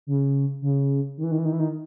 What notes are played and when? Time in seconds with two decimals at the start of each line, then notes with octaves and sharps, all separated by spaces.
0.07 C#3
0.62 C#3
1.17 D#3
1.24 E3
1.31 D#3
1.38 E3
1.45 D#3
1.52 E3
1.59 D#3